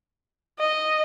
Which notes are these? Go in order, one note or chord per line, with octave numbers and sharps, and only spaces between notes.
D#5